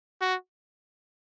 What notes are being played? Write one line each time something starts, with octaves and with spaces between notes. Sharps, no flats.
F#4